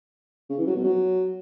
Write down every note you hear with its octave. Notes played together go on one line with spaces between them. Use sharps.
C#3
E3
F#3
B2
F#3